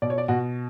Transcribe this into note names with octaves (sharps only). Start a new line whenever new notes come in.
B2 D5
C#5
D5
B2 F#4